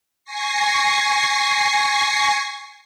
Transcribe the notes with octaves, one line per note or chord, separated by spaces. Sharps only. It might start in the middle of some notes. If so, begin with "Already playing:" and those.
G#5 C#6 A#6 C7